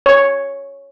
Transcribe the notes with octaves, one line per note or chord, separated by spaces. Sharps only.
C#5